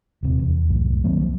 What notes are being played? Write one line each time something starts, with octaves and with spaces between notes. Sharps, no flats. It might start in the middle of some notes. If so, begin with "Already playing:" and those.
D#1 C3
E2
C2 F#2 A2
D#3 F#3 A#3 C4
F3